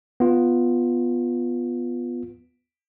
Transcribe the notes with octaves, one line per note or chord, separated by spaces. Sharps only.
B3 F4